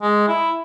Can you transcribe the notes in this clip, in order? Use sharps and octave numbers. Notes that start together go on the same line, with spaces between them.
G#3
E4